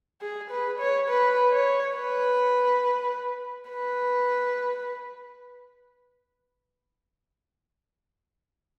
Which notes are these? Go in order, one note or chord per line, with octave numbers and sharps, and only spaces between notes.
G#4
B4
C#5
B4
C#5
B4
B4